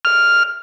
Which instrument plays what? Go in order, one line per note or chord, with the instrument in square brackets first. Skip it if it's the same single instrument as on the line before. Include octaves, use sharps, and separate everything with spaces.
[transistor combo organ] F6